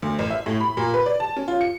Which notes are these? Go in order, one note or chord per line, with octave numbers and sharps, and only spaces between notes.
D2
A1
E5
A2
B5
A#2
B4
D5
A5
C#4
F4
C#7